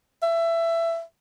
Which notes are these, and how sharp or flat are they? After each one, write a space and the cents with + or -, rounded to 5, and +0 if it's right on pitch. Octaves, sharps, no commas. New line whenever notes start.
E5 +20